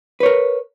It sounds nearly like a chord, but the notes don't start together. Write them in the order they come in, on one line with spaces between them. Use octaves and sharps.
B4 C#5 A#4